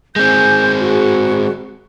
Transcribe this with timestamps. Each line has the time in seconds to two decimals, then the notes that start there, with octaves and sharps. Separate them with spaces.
0.16 G#3 C4 G#5 G6
0.79 F#4 G#4